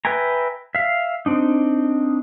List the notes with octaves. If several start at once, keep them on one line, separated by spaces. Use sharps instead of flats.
B4 E5 G5 G#5 A#5
E5 F5
C4 D4 D#4